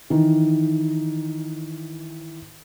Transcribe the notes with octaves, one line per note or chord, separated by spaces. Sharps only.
D#3 E3